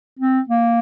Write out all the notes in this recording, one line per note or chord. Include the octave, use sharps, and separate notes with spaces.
C4
A#3